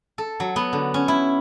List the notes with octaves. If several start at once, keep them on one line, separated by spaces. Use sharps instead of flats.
A4
F#3
B3
D3
C#4
E4